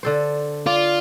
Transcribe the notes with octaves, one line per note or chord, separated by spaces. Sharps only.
D3 A4 C5
F4 D5